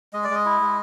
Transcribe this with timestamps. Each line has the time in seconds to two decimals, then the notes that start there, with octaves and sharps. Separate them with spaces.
0.13 G#3 D#5
0.24 D5
0.30 G#3
0.35 D#5
0.45 E4
0.61 G#3